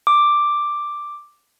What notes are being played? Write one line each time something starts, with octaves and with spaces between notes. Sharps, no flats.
D6